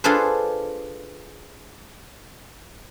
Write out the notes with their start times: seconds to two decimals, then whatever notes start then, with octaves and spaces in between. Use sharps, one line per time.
0.04 D4 F4 G#4 A4 B4 C5